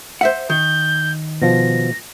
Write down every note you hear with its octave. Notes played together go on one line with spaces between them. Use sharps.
C5 E5 F#5
D#3 G6
B2 F3 A#6